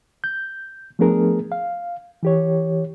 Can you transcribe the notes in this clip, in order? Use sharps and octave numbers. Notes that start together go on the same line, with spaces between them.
G6
F3 A3 B3 D4 G#4 A#4
F5
E3 G4 C#5